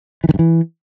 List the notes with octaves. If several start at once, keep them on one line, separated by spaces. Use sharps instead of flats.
E3
D#3
G2
E3